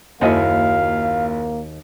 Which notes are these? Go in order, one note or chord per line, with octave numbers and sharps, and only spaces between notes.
F#1 D#2 A#3 E4 F#4 D#5 F5